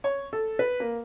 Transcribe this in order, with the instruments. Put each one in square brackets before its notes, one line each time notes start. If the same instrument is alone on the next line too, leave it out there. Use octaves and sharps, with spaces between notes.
[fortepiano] C#5
A4
B4
A#3